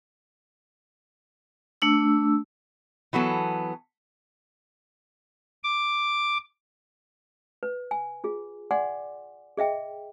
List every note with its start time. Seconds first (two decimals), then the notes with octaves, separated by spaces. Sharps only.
1.82 A3 D4 E6
3.13 E3 F#3 B3 A4
5.64 D6
7.63 B4
7.91 G#5
8.24 F4 G#4
8.71 D5 F#5 G#5 C6 D6
9.57 G#4 D#5 E5 G5